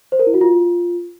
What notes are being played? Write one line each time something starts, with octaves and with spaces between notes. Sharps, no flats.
C5
A#4
E4
F#4
F4